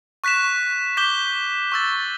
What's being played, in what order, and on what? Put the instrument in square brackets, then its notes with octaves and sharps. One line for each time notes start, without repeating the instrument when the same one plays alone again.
[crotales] C#6 F#6 B6 E7
D6 G6 B6 E7 G7
C#6 E6 A6